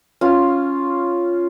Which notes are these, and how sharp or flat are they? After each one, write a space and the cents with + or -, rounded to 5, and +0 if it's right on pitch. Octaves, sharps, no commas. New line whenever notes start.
C#4 +0 F4 +0